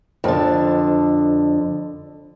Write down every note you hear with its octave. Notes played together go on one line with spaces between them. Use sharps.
F2 D3